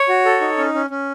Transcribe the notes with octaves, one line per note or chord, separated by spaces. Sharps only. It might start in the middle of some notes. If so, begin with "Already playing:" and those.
Already playing: C#5
F#4
A4
D#4
C#4
C#4
C#4